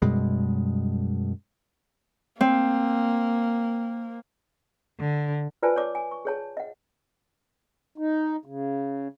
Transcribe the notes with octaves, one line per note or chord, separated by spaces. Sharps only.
F#2 B2 G3 G#3
A#3 C4
D3
F4 B4 C5 D5 G#5 A5
C#5 D5 D6
G#5
C#6
G#4 C#5 A5
D#5 F#5
D#4
C#3